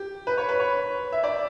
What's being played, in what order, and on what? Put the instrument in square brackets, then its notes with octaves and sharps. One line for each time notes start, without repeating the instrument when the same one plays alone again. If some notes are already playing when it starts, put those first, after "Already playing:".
Already playing: [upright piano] G4
B4
C#5
B4
C#5
E5
D5